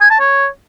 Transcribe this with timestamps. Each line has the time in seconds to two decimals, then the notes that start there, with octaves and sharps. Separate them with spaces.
0.01 G#5
0.10 A5
0.20 C#5